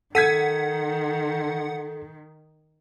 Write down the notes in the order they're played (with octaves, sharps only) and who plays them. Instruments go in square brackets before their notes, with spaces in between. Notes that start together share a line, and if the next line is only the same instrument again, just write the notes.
[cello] D#3 [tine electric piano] A4 [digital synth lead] F#5 [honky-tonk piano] G#6 B6 D#7